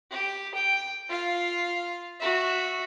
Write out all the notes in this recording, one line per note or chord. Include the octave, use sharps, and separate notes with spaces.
G4
G5
F4 F5
F#4 E5